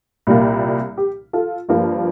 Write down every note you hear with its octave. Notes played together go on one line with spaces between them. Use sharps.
C2 A#2 G3 A#3
G4
F4 A4
G2 F3 A#3